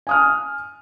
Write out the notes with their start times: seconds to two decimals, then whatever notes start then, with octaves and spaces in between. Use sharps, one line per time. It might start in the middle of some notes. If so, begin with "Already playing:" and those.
0.07 G#5 D#6 F6